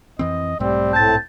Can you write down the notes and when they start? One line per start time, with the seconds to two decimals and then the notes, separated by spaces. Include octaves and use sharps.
0.19 F2 E3 C4 D#5
0.60 B1 G#2 G3 A3 C4
0.93 A2 A5 G6 A6